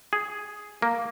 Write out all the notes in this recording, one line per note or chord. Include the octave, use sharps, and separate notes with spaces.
G#4
A#3